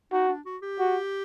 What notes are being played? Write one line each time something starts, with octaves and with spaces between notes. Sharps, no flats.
D#4 F#4
D4
F#4
G4
F#4